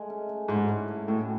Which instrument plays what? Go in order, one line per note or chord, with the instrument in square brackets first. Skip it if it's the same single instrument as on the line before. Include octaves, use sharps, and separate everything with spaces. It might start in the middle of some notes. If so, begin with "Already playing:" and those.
Already playing: [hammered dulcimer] G#3 A3
C#4
A3
[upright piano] G#2 [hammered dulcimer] E4
[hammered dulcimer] C#4
A3
[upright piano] A2 [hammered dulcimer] F#4